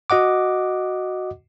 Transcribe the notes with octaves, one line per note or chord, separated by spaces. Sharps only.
F#4 D#5 F#5 D6